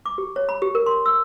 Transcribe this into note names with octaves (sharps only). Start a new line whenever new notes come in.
D6
G4
C#5
B5
G4
A#4
C6
E6